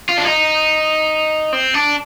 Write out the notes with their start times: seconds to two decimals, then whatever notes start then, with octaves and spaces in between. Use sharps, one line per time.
0.09 F4
0.17 D4
0.25 D#4
1.53 C4
1.74 D4